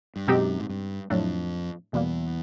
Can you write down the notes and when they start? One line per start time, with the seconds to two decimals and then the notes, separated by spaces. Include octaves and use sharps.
0.16 G2
0.27 F#2 B2 G#3 C4 D#4 G4
0.60 G#2
0.69 G2
1.10 F2 A2 F#3 A3 D4
1.93 E2 B2 G3 A#3